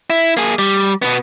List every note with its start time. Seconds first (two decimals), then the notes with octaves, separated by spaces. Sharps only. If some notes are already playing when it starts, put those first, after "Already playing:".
0.10 E4
0.37 A#3 G#4
0.59 G3
1.02 B2 B3